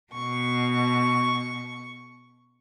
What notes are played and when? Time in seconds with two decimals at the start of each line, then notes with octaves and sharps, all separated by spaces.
0.13 B2 C#6